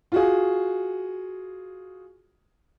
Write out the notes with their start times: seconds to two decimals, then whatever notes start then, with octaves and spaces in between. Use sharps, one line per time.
0.12 F4 F#4 G#4